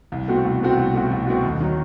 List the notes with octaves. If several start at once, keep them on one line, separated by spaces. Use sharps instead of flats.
C2
B2 A3 C4 F#4
C2
B2 A3 C4 F#4
C2
B2 A3 C4 F#4
C2
B2 A3 C4 F#4
D#2
D#3 F#3